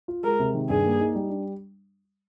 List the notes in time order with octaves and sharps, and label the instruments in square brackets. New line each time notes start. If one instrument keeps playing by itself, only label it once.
[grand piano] F4
[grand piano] G#3 [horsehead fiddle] A#4
[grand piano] C3
D#3
[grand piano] G2 [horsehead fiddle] G#4
[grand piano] A#3
D#4
G3
D4